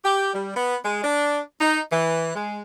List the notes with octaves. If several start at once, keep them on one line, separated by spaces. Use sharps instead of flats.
G4
G3
B3
G#3
D4
D#4
E3
G#3